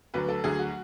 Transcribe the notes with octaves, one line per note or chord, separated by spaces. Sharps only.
D2 D3 F#3 B4
A4
D2 D3 F#3 G#4
F#4